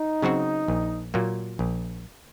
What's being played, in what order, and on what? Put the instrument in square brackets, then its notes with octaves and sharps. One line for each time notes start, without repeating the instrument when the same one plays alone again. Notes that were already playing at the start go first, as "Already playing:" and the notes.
Already playing: [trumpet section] D#4
[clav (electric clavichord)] C#3 F#3 C4 F#4
A#1
A#2 F#3 A#3
A#1